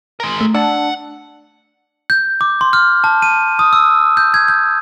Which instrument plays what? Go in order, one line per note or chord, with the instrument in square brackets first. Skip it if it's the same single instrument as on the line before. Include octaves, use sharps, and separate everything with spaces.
[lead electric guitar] G#3 A#4
[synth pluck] A3
[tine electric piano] D4 [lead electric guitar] F#5 [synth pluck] A5 E6
[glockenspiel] G6
D6
C6
F6
A5
D#7
D#6
E6
G6
G#6
G6